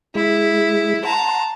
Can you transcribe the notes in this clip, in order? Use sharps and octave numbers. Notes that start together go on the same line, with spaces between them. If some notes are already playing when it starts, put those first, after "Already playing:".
G#3 E4 G#4
F#5 A5 A#5 C6